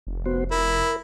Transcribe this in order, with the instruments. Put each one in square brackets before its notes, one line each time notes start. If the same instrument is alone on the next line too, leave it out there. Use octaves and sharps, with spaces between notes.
[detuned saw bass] F1
[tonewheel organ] B3 F#4 C5
[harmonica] E4 [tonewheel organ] A#4